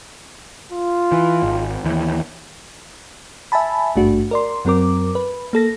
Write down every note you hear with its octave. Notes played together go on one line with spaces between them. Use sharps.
F4
E3
G#1
D#2 E3
E5 G#5 A5 B5
G#1 G2 A3 D4 F#4
A#4 D5 C6
F#2 F#3 C4 A#4 D6
B4
A#3 A4 A#6